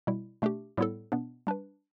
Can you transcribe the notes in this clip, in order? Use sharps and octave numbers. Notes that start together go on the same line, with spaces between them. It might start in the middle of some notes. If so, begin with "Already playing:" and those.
B2 G3 E4
B2 A3 D4 G4
A2 G3 B3 E4 A4
B2 B3 D4
G3 D4 B4